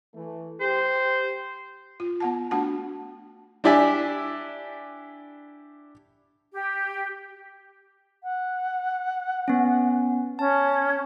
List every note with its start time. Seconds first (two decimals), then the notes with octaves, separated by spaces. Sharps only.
0.15 E3 A3
0.60 G4 C5
2.00 F4
2.20 B3 F#5 A5
2.51 A3 D4 F#4 F#5 A5
3.64 D4 E4 G4 D5 E5 G#5
6.53 G4
8.23 F#5
9.48 B3 C#4
10.39 C#4 A5